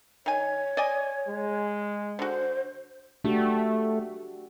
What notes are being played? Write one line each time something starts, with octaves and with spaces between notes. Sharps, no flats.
D#3 C#5 G#5
D5 D#5 G#5
G#3
D3 F#4 C5
A3 D4 F#4 G4